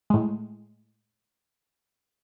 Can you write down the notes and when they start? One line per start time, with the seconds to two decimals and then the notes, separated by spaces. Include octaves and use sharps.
0.10 A2 G#3